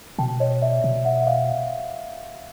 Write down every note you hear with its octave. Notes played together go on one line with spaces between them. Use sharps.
B2 G5 A5
C#5 D#5
D5 E5
B2
E5 F#5
F#5
D#5 F5